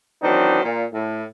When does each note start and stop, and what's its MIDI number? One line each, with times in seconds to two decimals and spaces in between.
0.22 0.60 51
0.22 0.60 52
0.22 0.60 54
0.22 0.60 60
0.22 0.60 62
0.22 0.60 63
0.64 0.84 46
0.93 1.23 45